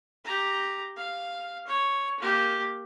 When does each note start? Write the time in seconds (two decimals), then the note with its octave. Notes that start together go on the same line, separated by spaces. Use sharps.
0.25 G4 A#5
0.97 F5
1.67 C#5
2.20 A#3 G4